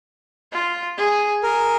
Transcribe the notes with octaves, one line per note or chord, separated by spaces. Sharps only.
F4
G#4
G#4 A#4